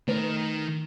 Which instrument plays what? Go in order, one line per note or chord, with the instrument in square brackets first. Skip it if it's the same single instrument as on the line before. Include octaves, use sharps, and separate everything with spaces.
[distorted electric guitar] D#3 A#4 [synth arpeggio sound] A3 B4